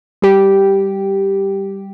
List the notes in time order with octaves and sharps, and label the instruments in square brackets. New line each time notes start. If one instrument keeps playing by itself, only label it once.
[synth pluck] G3 G4